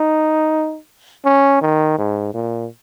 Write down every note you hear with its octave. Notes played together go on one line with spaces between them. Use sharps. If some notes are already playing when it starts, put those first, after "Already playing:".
Already playing: D#4
C#4
D#3
G#2
A#2